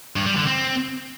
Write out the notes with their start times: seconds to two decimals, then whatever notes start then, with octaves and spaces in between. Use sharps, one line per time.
0.16 G2
0.26 G3
0.36 D3
0.47 C4